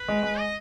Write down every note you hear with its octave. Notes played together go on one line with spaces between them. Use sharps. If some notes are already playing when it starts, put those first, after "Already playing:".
Already playing: B4
G#3
G#3
D#5